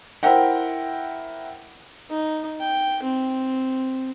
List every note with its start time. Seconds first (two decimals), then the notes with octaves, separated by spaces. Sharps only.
0.23 E4 A#4 C5 E5 F#5 G5
2.10 D#4
2.60 G5
3.03 C4